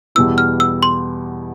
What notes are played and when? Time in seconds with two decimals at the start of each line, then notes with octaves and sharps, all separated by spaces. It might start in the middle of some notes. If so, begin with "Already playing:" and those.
0.15 E2 B2 G3 B3 E4 E6
0.38 F6
0.60 E6
0.83 C6